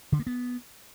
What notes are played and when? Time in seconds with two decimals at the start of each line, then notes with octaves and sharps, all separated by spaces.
0.12 D3
0.19 A#3
0.27 B3